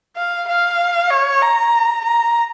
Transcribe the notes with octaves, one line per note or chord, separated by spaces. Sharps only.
F5
F5
C#5
A#5
A#5